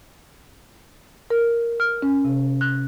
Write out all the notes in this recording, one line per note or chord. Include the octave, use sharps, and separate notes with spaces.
A#4
F6
C#4
C3
F#6